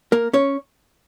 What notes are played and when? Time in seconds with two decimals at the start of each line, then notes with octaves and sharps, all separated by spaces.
0.12 A#3 A#4
0.33 C#4 C#5